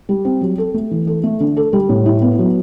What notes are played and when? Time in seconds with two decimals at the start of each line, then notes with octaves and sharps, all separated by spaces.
0.09 G3
0.25 C4
0.41 F#3
0.58 A4
0.74 A3
0.91 E3
1.07 A4
1.23 A3
1.40 D3
1.57 A4
1.73 G3
1.89 A2
2.06 E4
2.22 B3
2.39 F#3